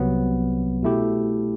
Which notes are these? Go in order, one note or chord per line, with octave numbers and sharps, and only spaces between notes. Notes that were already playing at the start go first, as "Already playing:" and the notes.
Already playing: C2 C3 F#3 B3
B2 A3 E4 G4